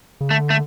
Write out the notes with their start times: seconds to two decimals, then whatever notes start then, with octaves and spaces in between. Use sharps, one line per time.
0.21 C#3
0.30 D3 A3
0.50 A3